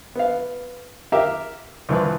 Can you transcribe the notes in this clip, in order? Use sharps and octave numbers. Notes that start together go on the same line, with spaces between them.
B3 F5
G4 A#4 E5 F5
C2 E3 F3 B4